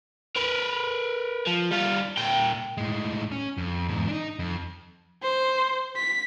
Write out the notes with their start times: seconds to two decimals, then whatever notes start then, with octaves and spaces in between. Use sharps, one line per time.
0.36 A#4 B4
1.47 F3
1.71 G3 F4
2.17 A#2 G5
2.78 A2 G#3
3.32 C#4
3.58 F2
3.88 E2 G#2
4.08 D4 D#4
4.39 F2
5.23 C5
5.96 B6